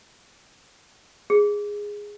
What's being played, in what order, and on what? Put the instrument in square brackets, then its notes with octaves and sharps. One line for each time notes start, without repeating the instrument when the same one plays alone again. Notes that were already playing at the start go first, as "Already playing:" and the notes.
[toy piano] G#4